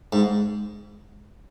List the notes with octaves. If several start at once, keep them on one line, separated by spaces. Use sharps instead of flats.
G#2